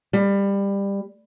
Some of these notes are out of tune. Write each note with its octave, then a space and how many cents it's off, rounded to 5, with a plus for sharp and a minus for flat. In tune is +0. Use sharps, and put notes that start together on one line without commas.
G3 +20